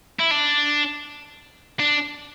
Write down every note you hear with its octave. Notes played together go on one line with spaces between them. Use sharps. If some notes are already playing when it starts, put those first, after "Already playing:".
E4
D4
D4